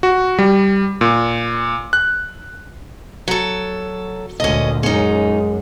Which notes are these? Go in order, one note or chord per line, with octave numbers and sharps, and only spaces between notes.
F#4
G3
A#2
F#6
F#3 A4
D2 A#2 C#4 D#5
F#2 G#3 C#4 D#4